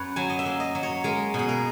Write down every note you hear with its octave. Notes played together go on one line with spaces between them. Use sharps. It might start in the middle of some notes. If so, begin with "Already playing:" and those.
Already playing: F#2 B4 C#5
F#3 G#5
D#5
E5
A#3
D#5
F#3
C#5
G#3 A#4
B2
G#4
A#4